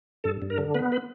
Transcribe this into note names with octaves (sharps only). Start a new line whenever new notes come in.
G2 A4
G2
A#4
D3
B3 B4
B4